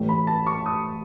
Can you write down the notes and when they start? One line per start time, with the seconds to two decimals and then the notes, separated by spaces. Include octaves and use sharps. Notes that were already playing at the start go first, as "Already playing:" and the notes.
Already playing: A1 A2 E3 A3
0.09 B5
0.27 A5
0.47 C#6
0.66 D#6